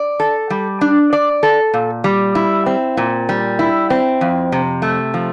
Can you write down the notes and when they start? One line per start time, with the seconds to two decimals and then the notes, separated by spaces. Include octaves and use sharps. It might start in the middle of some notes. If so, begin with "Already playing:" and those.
Already playing: D5
0.20 A4
0.50 G3
0.81 D4
1.13 D5
1.43 A4
1.74 A#2
2.04 G3
2.35 E4
2.66 C4
2.97 A#2
3.29 G3
3.59 E4
3.90 C4
4.21 F2
4.52 C3
4.82 A3
5.14 F3